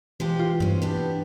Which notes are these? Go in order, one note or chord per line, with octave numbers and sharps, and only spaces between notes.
E3 F3 G#3 G4
F4
G2 C4 C#4
B3 D4 G4